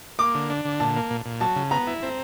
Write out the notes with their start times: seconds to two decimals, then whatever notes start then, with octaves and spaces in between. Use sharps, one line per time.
0.19 A#3 D6
0.35 D3
0.50 D4
0.65 D3
0.80 A#2 A5
0.96 A#3
1.10 A#2
1.26 A#2
1.41 F#3 A5
1.56 C#3
1.71 B3 A#5
1.87 E4
2.03 C4